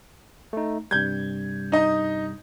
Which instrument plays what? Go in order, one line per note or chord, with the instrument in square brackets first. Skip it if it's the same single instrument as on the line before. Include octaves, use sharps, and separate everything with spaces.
[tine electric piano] A3 D#4
[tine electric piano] G2 C3 G3 [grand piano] G6 G#6
[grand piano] D#4 D#5